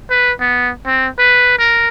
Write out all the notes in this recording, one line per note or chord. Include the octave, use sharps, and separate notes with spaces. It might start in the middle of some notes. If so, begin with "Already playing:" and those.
B4
B3
C4
B4
A#4